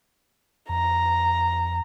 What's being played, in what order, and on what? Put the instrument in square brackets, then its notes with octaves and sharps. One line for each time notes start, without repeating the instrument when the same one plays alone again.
[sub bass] F2 [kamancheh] A#5